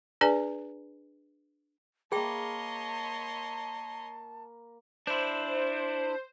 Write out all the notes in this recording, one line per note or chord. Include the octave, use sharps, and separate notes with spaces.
D4 G#4 B4 D5 G#5
A#3 G#4 C#5 D#5 G5 A5 B5 C6
D4 E4 C5